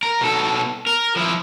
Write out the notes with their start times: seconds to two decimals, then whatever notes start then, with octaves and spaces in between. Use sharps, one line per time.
0.03 A#4
0.21 B2 A4
0.86 A#4
1.16 F3 E4